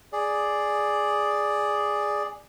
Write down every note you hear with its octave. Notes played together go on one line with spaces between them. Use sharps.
G#4 D5